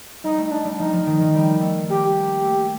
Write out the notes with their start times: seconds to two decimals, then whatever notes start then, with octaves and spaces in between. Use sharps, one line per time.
0.24 G3 D#4
0.38 A3
0.46 D#4
0.51 D4
0.65 G3
0.79 F3 D#4
0.93 F3
1.06 D#3
1.20 D#3
1.35 G3
1.61 A3
1.89 A#3 G4
2.45 A3